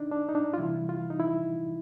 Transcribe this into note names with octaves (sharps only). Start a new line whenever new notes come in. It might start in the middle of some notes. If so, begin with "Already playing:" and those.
Already playing: D4 D#4
D4
D#4
D4
F4
C3 E3 G3 E4
F4
D#4
E4